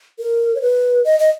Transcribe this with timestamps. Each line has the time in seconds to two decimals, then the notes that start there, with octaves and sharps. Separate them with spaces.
0.19 A#4
0.55 C#5
0.62 B4
1.05 D#5
1.19 D#5